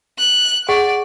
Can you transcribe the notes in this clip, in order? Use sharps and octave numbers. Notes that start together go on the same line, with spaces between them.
F#6
G#4 D5 F#5 C#6